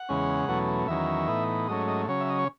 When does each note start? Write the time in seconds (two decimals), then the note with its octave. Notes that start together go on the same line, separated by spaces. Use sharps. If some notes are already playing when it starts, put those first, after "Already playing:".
Already playing: F#5
0.09 E2 C#3 G#3 C#4
0.48 E2 B2 F#3 A3 C#4
0.88 E2 D#3 F#3 C#4 E5
1.28 A2 E3 B3 D#4
1.68 G#2 F#3 A3 C#4 D#5
1.88 D#5
2.08 C#3 F#3 C#4 C#5
2.21 E5
2.29 D#5
2.38 C#5